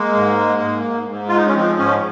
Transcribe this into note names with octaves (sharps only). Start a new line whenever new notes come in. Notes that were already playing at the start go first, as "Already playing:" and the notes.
Already playing: G#3 A#3
G#2
G#3
G#2
G#2
G#2
G#3 F4
D#4
C#4
F3 C4
G#2 C#4